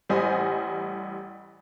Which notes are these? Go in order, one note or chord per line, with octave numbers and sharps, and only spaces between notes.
A1 G3 C5 D#5 G#5